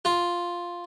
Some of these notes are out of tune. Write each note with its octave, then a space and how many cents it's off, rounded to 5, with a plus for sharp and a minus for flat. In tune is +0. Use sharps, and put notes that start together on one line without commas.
F4 +0